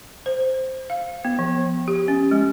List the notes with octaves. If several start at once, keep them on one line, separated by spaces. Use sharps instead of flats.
C5
F5
B3
F3
G4
C#4
G#3